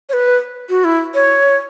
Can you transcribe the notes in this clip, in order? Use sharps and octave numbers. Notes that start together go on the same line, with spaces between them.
C#5
B4
F#4
E4
C#5